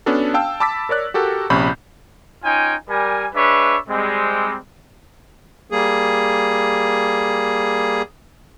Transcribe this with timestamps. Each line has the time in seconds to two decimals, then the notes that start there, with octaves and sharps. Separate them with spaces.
0.06 B3 C#4 D4 F#4 A4
0.34 F5 G5 A5 E6
0.60 A5 B5 D6 E6 A6 B6
0.89 A#4 C#5 D5 F#6
1.14 F#4 G4 A4 A#4
1.50 A#1 C3 C#4 B5 C#6 G6
2.44 C#4 D#4 F4 G5 G#5
2.89 G3 A#4 G#5
3.34 G#3 D4 B4 C#5 E5 B5
3.88 G3 G#3 C4
5.70 G3 A#3 G#4